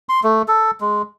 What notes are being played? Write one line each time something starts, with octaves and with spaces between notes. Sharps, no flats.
C6
A3
A4
G#3